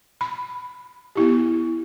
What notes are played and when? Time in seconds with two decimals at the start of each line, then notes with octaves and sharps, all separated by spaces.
0.21 B5
1.16 B3 E4 G4